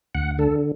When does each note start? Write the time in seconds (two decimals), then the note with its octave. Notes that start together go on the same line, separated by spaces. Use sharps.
0.15 D2 F#5
0.38 D3 A4